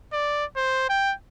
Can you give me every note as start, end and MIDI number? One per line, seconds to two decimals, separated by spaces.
0.13 0.45 74
0.56 0.85 72
0.89 1.13 79